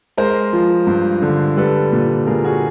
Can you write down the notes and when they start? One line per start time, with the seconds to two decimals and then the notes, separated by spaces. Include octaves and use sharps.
0.17 G#3 A#4 C5
0.53 F3
0.87 G2
1.22 D3
1.57 G3 A4 B4
1.92 A#2
2.27 A#2 G#4 A#4
2.45 F#4 G#4